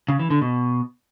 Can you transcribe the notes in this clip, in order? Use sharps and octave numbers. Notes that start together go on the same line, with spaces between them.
C#3
E3
D3
B2